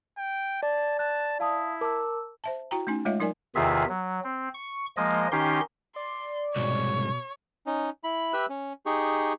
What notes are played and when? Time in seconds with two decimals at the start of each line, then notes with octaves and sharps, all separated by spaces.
0.18 G5
0.63 D5 A5
0.99 A5 F#6
1.40 E4 F5 A5 D#6
1.81 A#4 A5 D6 E6
2.44 C5 E5 A5
2.71 E4 F#4 G5 A#5
2.87 A3 C#4 D#4 G#5
3.05 G#3 A3 F4 C#5 D#5 E5
3.20 F#3 D#4 A#4 D5 G#5
3.55 E2 C3 D#3 F4 G#4 E5
3.89 F#3
4.24 C4
4.54 C#6
4.97 F3 G#3 A#3 D#5
5.32 D#3 C#4 D#4 G4 C6
5.96 D5 C6
6.56 C2 G#2 B2 C#5
7.66 C#4 D#4
8.04 E4 B5
8.33 G4 B4 E5 E6 F#6
8.49 C#4
8.86 D#4 G4 G#4 C#6